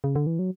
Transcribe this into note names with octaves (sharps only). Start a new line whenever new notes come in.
C#3
D3
E3
F#3